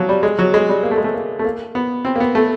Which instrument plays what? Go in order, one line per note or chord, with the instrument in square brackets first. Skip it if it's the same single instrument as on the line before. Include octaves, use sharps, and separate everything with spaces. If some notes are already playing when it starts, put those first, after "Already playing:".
Already playing: [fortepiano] F3 F#3
G3
G#3
F#3
G#3
G3
A#3
A3
G#3
A3
A#3
A3
A#3
B3
C4
A#3
B3
A3